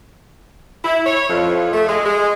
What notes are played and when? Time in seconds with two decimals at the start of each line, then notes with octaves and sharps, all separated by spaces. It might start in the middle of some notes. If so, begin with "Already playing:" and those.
0.84 E4
1.06 C#5
1.29 F2
1.73 A3
1.88 G#3
2.05 G#3